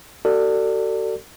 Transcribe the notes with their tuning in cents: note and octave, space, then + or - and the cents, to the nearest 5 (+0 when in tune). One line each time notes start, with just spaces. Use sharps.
F#4 +45 A4 +40 D5 +0